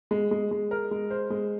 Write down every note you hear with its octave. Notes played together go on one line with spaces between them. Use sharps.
G#3
G#3
G#3
A#4
G#3
C5
G#3